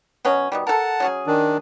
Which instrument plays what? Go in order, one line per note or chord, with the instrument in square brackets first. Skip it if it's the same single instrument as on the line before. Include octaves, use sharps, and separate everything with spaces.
[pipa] B2 F#3 C#4
B2 D#3 G3
[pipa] A4 A#4 [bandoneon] F#5 A5
[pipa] F#3 C#4 G#4
[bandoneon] D#3 D4